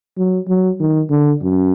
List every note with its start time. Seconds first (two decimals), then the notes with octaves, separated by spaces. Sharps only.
0.18 F#3
0.48 F#3
0.80 D#3
1.10 D3
1.42 F#2